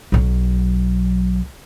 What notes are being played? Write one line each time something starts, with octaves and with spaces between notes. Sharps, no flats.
B1 F#3